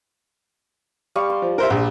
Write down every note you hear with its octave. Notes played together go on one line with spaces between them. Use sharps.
G3 F5 C#6
C6
F3
A#4 C5 E5
A#1